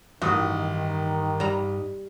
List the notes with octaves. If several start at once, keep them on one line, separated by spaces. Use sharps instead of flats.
A1 G2 D#3 D#4 F#4 D#6
G3 A#5